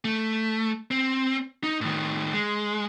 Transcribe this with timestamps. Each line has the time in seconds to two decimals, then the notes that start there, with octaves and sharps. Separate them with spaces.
0.05 A3
0.91 C4
1.63 D#4
1.81 A2 D#3
2.34 G#3